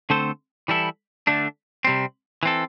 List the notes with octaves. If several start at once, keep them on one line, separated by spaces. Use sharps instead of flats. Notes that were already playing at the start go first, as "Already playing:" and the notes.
D3 A3 C4 A4 C5
E3 G3 E4 A4
D3 A3 D4
C3 G3 C4
E3 C4 A4